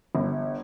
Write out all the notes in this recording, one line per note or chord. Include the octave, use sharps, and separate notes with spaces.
G1